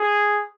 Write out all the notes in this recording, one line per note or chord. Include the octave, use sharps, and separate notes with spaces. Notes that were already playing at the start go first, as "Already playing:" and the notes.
Already playing: G#4